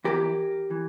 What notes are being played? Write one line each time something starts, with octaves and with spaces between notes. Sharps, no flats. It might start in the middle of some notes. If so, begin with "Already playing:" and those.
E2 E3 G4 A#4
E3